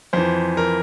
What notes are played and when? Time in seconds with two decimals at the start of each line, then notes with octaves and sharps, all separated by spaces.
0.13 F2 E3 C5
0.57 A#4